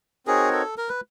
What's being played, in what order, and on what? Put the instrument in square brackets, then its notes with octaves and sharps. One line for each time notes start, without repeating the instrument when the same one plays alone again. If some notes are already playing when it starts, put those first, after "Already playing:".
[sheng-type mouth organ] C4 D#4 F#4 A#4 C#5 [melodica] G#4
[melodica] A4
A#4
B4